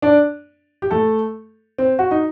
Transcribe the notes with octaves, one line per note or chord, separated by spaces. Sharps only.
D4 D5
G4
A3 A4
C4
F#4
D#4